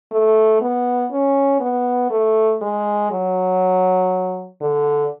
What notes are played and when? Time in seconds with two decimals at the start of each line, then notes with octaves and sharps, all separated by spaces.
0.12 A3
0.61 B3
1.12 C#4
1.60 B3
2.10 A3
2.62 G#3
3.11 F#3
4.61 D3